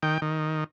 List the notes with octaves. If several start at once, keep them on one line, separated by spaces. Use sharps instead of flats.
D#3 G5
D#3